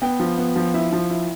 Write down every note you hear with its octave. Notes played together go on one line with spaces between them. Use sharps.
B3 G5
F3
B3
F3
E4
F3
E4